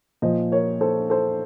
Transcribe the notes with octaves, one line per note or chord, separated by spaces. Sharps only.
A#2 F3 C5 D#5
A#4 C#5
A4 C5
A4 C5